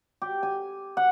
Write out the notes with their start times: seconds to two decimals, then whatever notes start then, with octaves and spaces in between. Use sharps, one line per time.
0.22 G4
0.43 G#5
0.97 F#5